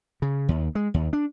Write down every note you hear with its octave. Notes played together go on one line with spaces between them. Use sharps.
C#3
D#2
G#3
D#2
D4